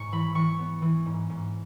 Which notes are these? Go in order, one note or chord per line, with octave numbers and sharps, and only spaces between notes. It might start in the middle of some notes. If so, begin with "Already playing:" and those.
Already playing: G#2 C#6
E3 B5
E3 C#6
B3
E3
G#2
G#2